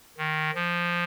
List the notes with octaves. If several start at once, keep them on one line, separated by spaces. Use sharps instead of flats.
D#3
F3